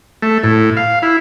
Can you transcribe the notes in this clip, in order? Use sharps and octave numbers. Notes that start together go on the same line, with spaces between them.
A3
A2
F5
E4